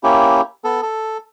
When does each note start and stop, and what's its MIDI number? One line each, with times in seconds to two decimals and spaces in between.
0.03 0.41 58
0.03 0.41 61
0.03 0.41 64
0.03 0.41 67
0.64 0.81 59
0.64 0.81 69
0.82 1.18 69